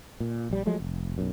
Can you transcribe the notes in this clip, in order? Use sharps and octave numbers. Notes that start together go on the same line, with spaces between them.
A#2
A#1 G3
F3 F#3 G#3 A3
F1
B1 F#2